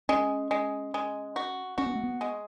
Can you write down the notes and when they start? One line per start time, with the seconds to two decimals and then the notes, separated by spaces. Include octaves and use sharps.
0.09 G#3 C#4
0.51 G#3
0.94 G#3
1.36 F#4
1.78 C#4 F#4
1.86 B3
1.95 A3
2.04 B3
2.21 G#3